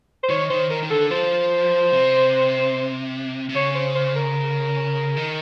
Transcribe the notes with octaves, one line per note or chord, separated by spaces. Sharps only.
C5
D#3 C#5
D#3 C5
D#3 A#4
D#3
D3 A4
F3 C5
C3
C3
C#3 C#5
C5
C5
A#4
D#3